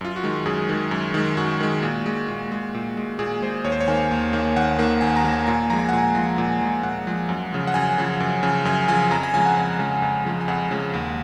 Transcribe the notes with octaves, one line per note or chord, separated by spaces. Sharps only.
F#2 F4
F#4
D#3 G#3
F#2 G#4
D#3 G#3
F#2
D#3 G#3
F#2 F#4
D#3 G#3
A#2
G#3
A#2
G#3
A#2
G#3
A#2 G#4
G#3 C5
D#2 C#5
C5
C#5
D#3 A#3 G#5
D#2
D#3 A#3
D#2 F#5
D#3 A#3
D#2 G#5
A#5
D#3 A#3
G#5
A#2 G#5
F3 G#3 A#5
G#5
A#2 F#5
G#5
F3 G#3
A#2
F3 G#3
A#2 F#5
F3 G#3
F#2
C#3 F3
F#5
F#2 G#5
C#3 F3
F#2
C#3 F3
F#2 G#5
C#3 F3 G#5
F2 A#5
G#5
C#3 F3 G#3 G#5
F#5
F2
C#3 F3 G#3
F2
C#3 F3 G#3
G#5
F2 F#5
C#3 F3 G#3
D#2